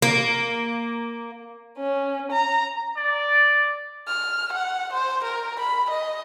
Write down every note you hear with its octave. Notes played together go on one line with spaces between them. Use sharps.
A#3
C#4
A#5
D5
F6
F#5
C5
A#4
B5
D#5